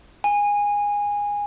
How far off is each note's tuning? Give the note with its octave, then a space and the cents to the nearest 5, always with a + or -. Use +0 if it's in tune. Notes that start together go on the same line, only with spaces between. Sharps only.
G#5 -20